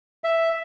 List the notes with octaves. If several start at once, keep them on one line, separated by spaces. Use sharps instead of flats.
E5